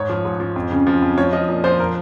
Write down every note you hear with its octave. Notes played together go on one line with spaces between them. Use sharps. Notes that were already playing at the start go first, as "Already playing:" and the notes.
Already playing: G#2 C#5
F3
G#2
F3
F2
C#3
F3
F2
F3 C#5
F3 D#5
A#2
F3 C5
A#4